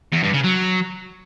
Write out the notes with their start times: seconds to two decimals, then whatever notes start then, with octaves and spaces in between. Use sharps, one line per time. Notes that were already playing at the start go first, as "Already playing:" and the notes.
0.12 E2
0.23 G2
0.33 C#3
0.44 F#3